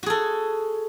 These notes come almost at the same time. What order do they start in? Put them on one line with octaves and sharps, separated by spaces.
F#4 G#4 A4